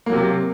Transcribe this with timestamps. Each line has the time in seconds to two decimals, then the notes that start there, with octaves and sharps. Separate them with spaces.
0.06 A#3
0.10 F#3
0.13 C3